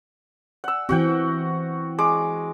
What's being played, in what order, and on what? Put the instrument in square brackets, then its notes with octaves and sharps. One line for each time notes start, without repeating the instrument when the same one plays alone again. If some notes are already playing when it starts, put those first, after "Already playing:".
[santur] F#5 E6
[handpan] E3 C4 [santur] F#4 F#5 G5
[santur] G#3 D6